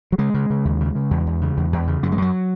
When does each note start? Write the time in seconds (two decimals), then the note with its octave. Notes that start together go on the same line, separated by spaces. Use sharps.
0.12 F#3
0.18 C#3 G#3
0.34 C#3
0.50 C#3
0.65 D#2
0.81 C#3
0.95 C#3
1.11 E2
1.27 E2
1.42 C#3
1.57 E2
1.73 E2
1.87 C#3
2.03 F#2 F#3
2.12 G#3
2.18 F#2 F#3